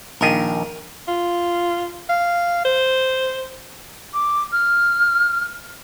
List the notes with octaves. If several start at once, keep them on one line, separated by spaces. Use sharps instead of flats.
A#1 D#3 A#4 D#6
F4
F5
C5
D6
F6